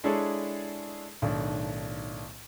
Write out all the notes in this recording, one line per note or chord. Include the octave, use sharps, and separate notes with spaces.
G#3 D4 E4 G#4 A4 C#5
B1 A2 D#3 D4